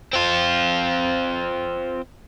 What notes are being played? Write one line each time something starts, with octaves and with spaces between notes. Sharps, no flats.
C4 F4